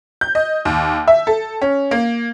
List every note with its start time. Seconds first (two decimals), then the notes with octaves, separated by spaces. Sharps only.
0.21 G6
0.35 D#5
0.65 D#2
1.08 E5
1.27 A4
1.61 C#4
1.91 A#3